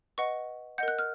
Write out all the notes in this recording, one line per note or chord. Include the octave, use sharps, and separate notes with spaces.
B4 D#5 F#5 C#6
A#4 D#5 F#5 G6
F#6
F6